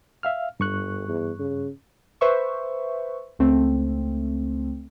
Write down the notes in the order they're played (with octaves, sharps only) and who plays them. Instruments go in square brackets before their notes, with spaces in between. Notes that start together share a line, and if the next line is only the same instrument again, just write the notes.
[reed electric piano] E5 F5 F6
[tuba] G1 [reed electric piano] G2 C#6 F#6
[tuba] E2
C#3
[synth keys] B4 C5 E5 C#6
C#2 A3 C4